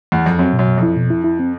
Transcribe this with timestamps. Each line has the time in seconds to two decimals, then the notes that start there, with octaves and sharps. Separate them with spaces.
0.12 E2
0.26 F2
0.39 F#2 C4
0.53 B2
0.59 F#2
0.68 B2
0.78 F2 E4
0.96 B2
1.10 E4
1.24 E4
1.39 C4